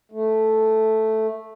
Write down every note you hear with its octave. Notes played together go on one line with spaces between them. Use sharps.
A3